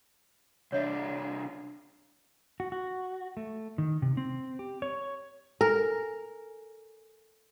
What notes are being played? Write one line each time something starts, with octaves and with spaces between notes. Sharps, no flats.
C2 D4 C#5 D#5 E5
F#4
F#4
A3
D#3
C3
C4
G4
C#5
A4 A#4 G#5